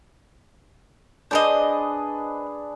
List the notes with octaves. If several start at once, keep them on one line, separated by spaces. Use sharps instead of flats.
D4 G#4 B4 C5 D5 D#5